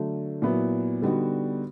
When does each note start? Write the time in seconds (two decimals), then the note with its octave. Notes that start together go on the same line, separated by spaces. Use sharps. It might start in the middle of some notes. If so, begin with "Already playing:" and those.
Already playing: D3 F#3 A3
0.42 A#2 F#3 B3 E4
1.02 D3 G3 B3 D#4 F#4